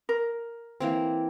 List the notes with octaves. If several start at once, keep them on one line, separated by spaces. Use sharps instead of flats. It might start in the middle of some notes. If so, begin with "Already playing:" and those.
A#4
E3 A#3 C4